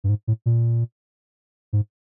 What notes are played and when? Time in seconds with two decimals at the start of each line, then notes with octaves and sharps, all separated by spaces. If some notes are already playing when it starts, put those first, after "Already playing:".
0.04 G2
0.09 G#2
0.27 A2
0.46 A#2
1.73 G#2